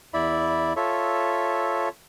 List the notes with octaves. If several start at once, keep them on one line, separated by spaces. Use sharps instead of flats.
E2 E4 D5 E5 B5
F4 A4 C#5 E5